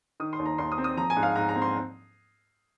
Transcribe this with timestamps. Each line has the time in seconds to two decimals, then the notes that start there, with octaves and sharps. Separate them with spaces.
0.20 D#3 D#6
0.33 C6
0.39 D#2
0.46 A#5
0.58 D#2 C6
0.72 D#6
0.78 C4
0.84 D#6
0.97 F3 A#5
1.10 G#5
1.17 G#2
1.23 F5
1.36 G#2 A#5
1.49 A#5
1.56 C4
1.62 C6